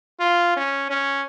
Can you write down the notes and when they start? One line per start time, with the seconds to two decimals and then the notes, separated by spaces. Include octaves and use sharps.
0.20 F4
0.57 C#4
0.90 C#4